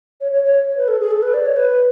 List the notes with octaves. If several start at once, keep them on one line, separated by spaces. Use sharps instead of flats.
C#5
C#5
C#5
C#5
B4
A4
G#4
A4
B4
D5
C#5
B4